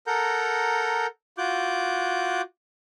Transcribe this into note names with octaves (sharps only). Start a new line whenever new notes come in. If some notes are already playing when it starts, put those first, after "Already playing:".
A4 A#4 F#5 A#5 G6
F4 F#4 D6 F#6 G6